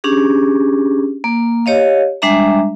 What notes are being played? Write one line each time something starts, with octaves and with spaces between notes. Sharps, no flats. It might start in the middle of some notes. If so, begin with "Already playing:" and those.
C#4 D4 G4 G#4
A#3
G4 C#5 D#5 F5
G3 G#3 D4 E5 A#5